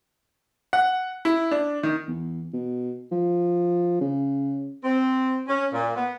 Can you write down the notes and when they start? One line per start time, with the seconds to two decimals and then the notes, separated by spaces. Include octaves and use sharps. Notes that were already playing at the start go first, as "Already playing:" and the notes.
0.73 F#5
1.25 E4
1.51 D4
1.83 D#3
2.08 E2
2.53 B2
3.11 F3
4.01 C#3
4.84 C4
5.48 C#4
5.73 A#2
5.96 B3